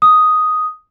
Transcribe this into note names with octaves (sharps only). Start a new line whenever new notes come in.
D#6